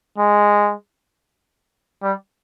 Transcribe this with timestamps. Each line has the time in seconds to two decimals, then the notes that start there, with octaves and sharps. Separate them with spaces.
0.18 G#3
2.03 G3